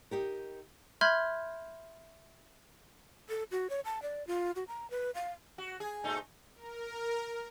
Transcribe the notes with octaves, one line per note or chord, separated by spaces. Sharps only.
D#4 G4 A#4
E5 B5 C6 F6 G6 G#6
A4
F#4
C#5
A5
D5
F4
F#4
A#5
B4
F5
F#4
G#4
A#2 A3 D#4
A#4